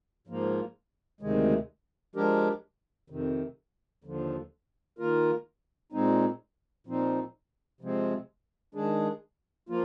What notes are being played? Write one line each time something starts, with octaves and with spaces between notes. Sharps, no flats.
G#2 F3 A#3
D2 C3 D#3 G#3
F3 G#3 D4 G4 A#4
F2 C3 D#3
D#2 D3 F3
D#3 A#3 F4 A#4
A#2 G#3 C4 D#4
A#2 F3 C4 D#4
C3 F3 G#3 C4
D#3 G#3 D4 G#4
F3 A#3 F4